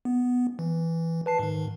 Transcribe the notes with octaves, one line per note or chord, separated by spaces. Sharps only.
B3
E3
B4 A5 C7
G#2 D#3